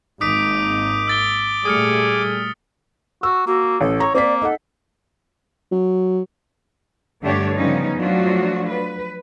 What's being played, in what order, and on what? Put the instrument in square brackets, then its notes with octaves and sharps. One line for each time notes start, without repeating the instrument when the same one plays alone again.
[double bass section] G#1 G#2 A#3 [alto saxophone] D#4 [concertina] D6 [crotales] D#6 B6 D7
[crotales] E6 A6 G7
[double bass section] A#2 G3 A3 [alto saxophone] G#4 [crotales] D#6 F6 C#7
[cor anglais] F#4 [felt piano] E6
[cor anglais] A#3 [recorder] F#4
[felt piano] A1 [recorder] A4
[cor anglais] C#5 [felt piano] A#5
[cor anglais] A#3 [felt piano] C4 B6 [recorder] D5
[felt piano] D#4 F#5 [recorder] A4
[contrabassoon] F#3
[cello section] G2 D3 A3 D4 G4 C#5
C#3 F3 G3 B3 C#4 D#4
F3 F#3 A3 D4 F4 F#4
B4